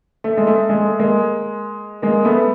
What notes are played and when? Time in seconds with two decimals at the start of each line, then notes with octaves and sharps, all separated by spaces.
0.24 A3
0.37 G#3
0.47 A3
0.69 G#3
0.85 A3
0.99 G#3 A#3
2.02 G#3 A#3
2.25 A3 B3